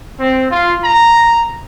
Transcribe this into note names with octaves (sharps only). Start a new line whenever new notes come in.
C4
F4
A#5